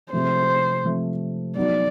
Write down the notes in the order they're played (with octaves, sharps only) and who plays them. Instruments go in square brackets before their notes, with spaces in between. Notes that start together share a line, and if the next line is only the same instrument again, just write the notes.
[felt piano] C3 F3 A3 [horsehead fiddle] C5
[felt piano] C3 F3 A3
[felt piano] F#3 B3 D#4 F#4 [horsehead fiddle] D5